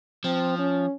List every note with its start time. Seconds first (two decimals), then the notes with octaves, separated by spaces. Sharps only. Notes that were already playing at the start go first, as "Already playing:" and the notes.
0.24 F3 C4
0.58 C#4